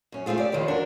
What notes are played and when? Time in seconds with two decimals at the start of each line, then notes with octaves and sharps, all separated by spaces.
0.12 F#2 C#4
0.26 A3 A#3 C4 F4 G#4
0.38 G4 D5
0.52 F2 D#3 F3 B4 C#5
0.68 D4 F#4 A#4